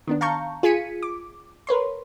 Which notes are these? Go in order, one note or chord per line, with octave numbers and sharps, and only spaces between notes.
D#3 B3 D4
F5 A5 A#5 C#6 G6
F4 G#4 G#6 B6 C#7 D#7
D6
A#4 B4 C#5 C6